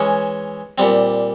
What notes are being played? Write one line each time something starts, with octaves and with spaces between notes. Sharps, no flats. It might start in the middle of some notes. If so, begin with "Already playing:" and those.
Already playing: E3 G#3 C#4
A#2 G3 C4